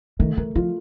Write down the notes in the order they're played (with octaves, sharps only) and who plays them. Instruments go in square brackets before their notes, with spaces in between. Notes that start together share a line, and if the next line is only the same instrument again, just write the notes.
[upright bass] D#3 [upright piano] A3
[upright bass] E3 [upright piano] A#4
[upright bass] F3 [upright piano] F4